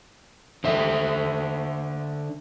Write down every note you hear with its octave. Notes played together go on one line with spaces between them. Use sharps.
D3 C5 E5